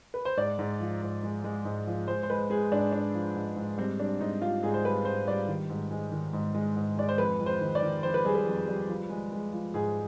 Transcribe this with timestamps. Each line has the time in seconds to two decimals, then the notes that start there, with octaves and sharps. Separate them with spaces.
0.14 B4
0.25 C5
0.37 G#2 D5
0.59 G#2
0.80 F3
1.02 G#2
1.23 G#3
1.44 G#3
1.65 G#2
1.87 F3
2.08 G#3 C5
2.23 C5
2.30 G#3 B4
2.50 G#3 G#4
2.71 G#2 D4
2.92 G#3 D4
3.14 F3
3.36 G#2
3.56 G#2
3.78 G3 C4
4.00 G3 D4
4.20 G#2 D#4
4.42 G3 F4
4.63 G#2 G#4
4.74 C5
4.84 G3 B4
5.05 G#2 C5
5.27 G3 D5
5.48 D#3
5.69 G#2
5.91 G#3
6.12 D#3
6.33 G#2
6.55 G#3
6.76 G#2
6.97 G#3 D5
7.09 C5
7.18 F2 B4
7.40 F2
7.46 C5
7.61 D#3
7.75 D5
7.82 D#3
8.03 F2 C5
8.14 B4
8.25 G3 G#4
8.35 B4
8.46 F2
8.68 G3
8.89 F3
9.10 G#3
9.32 G#3
9.52 F3
9.74 G#2 G#4